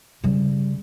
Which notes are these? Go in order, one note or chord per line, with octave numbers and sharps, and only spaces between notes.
C#3 G3